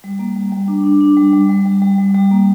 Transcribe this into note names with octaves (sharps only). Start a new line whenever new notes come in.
G3
A#3
G3
G3
D4
D4
D4
G3
G3
G3
G3
G3
G3
G3
A#3